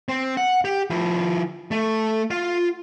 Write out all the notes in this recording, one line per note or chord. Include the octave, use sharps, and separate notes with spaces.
C4
F#5
G4
F3 E4
A3
F4 F5